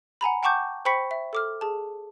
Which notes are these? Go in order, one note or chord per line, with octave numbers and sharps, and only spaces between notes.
F#5 G#5 A#5 B5
F#5 G5 A5 C#6 D6 G6
C5 G5 B5 C#6 B6 C#7
E5
A4 D6 F6
G#4 A5